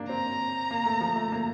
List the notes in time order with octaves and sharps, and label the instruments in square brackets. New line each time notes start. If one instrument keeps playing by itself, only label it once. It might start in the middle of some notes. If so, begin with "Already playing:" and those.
Already playing: [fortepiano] A#3 D4
[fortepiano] C4 [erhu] A#5
[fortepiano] A#3
A3
F3
A3
A#3